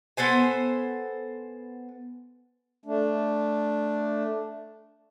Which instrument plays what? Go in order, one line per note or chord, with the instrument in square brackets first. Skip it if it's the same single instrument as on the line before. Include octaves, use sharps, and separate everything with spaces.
[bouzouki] B3 A4 C5 G#5
[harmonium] A3 D4